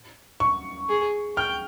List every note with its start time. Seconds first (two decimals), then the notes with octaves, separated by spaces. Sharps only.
0.40 C#6
0.89 G#4
1.37 G5 F6